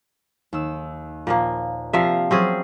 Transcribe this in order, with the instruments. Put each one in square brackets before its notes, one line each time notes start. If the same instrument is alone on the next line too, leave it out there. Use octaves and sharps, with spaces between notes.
[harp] D#2 E6
[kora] A#2 F3 A#3
[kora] C3 F3 E5 [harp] D5 F5 A#5
[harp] F3 F#3 [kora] C4 C#4 G#4